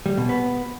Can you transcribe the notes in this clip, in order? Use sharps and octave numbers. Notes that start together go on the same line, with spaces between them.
G3
B2
B3